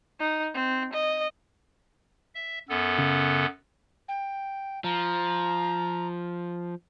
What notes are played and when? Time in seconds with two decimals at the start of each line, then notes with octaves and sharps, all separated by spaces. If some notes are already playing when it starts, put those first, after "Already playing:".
0.20 D#4
0.54 C4
0.93 D#5
2.35 E5
2.69 F#2 B3 A4
2.98 C#3
4.08 G5
4.84 F3 A#5